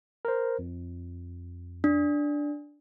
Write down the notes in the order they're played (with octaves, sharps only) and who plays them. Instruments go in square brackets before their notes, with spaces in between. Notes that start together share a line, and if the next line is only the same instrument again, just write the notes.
[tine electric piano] A#4 C5
F2
[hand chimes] D4